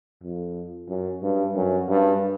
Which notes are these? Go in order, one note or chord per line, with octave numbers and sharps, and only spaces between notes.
F2
F#2
G2
F#2
G2